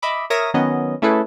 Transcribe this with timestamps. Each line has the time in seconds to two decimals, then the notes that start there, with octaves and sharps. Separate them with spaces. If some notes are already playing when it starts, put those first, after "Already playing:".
0.02 D#5 E5 B5 D6
0.30 A#4 C#5 E5 D#6 A#6
0.54 D#3 F#3 B3 C#4 D#5
1.02 A3 C#4 E4 G#4 A4 B4